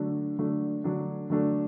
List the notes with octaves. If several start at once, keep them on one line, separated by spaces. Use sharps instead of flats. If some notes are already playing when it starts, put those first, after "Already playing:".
Already playing: D3 F#3 A3 D4
D3 F#3 A3 D4
D3 F#3 A3 D4
D3 F#3 A3 D4